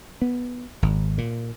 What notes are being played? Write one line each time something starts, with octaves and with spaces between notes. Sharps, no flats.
B3
G#1
A#2